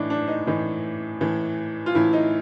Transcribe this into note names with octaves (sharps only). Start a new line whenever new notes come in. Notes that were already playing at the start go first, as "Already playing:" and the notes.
Already playing: A2 E3 D4 D#4
D4
D#4
A2 E3 D#4
A2 E3
F4
A2 E3 E4
D#4